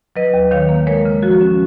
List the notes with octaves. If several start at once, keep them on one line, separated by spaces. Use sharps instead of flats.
F#3 B4 D#5
D#2
D#3 C#5 F5
A#3
G#3 A#4 C#5
C#3
F3 F#4
C#4